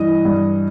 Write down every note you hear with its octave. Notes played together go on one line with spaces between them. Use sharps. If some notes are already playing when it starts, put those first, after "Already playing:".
Already playing: G2 E3 D#5
G2